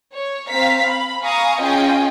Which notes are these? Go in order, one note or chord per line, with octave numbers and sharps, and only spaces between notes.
C#5
C4 F5 A#5 B6
B5
F5 G#5 A#5 C#6 D#6
C#4 F4 G#4 D#5 G5 G#5